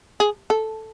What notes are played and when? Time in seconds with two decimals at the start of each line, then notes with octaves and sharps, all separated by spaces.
0.20 G#4
0.50 A4